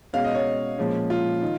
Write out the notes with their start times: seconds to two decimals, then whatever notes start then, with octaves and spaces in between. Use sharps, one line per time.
0.13 B2 G#3 C#4 F5
0.25 D#5
0.34 C#5
0.78 A#2 F3 G#3 C#4
1.10 F4
1.43 D#3